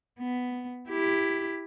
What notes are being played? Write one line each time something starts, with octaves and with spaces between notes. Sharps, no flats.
B3
E4 G4